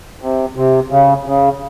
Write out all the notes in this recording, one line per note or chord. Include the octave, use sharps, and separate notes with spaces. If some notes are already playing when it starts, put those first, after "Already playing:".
C3
C3
C#3
C#3